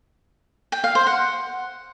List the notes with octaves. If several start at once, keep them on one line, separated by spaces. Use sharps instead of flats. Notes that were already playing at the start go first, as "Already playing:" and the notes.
G5
F5
C5
F#5